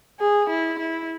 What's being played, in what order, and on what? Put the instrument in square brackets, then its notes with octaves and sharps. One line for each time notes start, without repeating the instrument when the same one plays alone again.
[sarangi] G#4
E4
E4